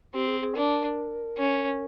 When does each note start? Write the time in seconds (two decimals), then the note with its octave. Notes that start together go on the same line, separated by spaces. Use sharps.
0.14 C4 G4
0.27 G#4
0.41 G#4
0.55 D4 A#4
1.38 C#4